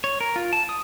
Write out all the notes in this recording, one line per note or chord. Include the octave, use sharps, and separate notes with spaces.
C#5
A#4
F4
A5
D#6